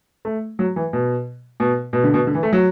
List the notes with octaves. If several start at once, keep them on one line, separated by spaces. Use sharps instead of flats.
A3
F#3
E3
B2
B2
B2
D3
B2
D3
E3
A3
F#3